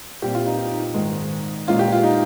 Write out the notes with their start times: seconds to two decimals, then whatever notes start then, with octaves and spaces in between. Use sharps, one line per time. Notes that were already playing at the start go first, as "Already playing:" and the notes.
0.22 A#2 G3 C4 G4
0.35 F4
0.46 D#4
0.59 D#4
0.94 G#2 D#3 G#3
1.68 A#2 G#3 C#4 F4
1.79 G4
1.92 F4
2.03 D#4